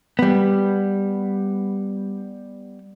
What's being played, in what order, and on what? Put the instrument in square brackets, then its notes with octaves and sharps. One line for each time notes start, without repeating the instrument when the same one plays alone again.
[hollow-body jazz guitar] G3 B3